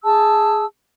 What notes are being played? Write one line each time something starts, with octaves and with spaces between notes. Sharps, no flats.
G#4 A5 E6